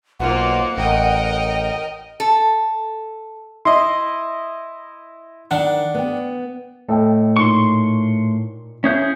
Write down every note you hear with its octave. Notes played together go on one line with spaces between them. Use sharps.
B1 A#3 F4 C5 F#5
A1 A#4 D#5 G5
A4
E4 D#5 C6
D#3 D4 F#5
B3 G5
A2 A4 D#5 G5
A#2 D#4 C6 C#6
C#4 E4 G#4 C#5 F5 G6